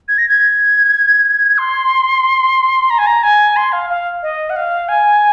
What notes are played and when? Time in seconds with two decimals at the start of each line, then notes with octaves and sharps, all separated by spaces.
0.08 G#6
0.18 A#6
0.28 G#6
1.58 C6
2.90 A#5
2.98 G#5
3.07 A#5
3.23 G#5
3.56 C6
3.72 F5
3.90 F5
4.23 D#5
4.50 F#5
4.56 F5
4.89 G#5